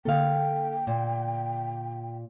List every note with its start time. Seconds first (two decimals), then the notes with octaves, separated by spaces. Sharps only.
0.05 D3 A#3 A4 F5 G5
0.87 A#2